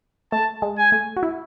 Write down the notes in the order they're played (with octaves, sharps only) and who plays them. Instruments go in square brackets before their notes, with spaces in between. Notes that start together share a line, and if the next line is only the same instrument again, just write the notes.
[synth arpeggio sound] A3 [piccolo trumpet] A5
[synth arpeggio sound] G#3
[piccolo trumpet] G#5
[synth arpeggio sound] A3
F#4
E4